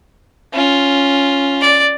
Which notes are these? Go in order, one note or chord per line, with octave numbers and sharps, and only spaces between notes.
C#4 F4
D5